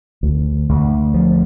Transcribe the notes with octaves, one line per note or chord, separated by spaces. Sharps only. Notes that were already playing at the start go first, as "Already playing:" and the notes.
D2
D2
F3